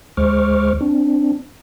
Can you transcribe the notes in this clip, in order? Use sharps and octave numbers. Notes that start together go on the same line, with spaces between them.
D2 G#3 C5 C#6 D6 F6
C4 D4